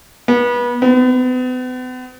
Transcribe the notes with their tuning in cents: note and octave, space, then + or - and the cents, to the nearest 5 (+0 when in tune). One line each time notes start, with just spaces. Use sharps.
B3 -30
B3 +40